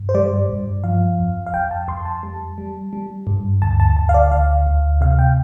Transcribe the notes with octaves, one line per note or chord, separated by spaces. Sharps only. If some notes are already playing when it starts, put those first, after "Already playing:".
Already playing: G2
C5
G3 D5
G2
F3 F5
F2
F5
F2 G5
A5
F2 C6
A5
G3
G3
G3
G2
D2 A5
A5
D2 A5
F5
D5
D2 F5
D2
C3 F5
G5